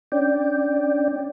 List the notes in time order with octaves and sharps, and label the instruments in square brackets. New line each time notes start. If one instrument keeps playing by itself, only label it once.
[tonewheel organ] C#4 D4 D5 G5